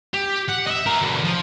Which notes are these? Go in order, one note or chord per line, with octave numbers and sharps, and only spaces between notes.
G4
F#5
D#5 E5
A#4 E5
B2 D3
F3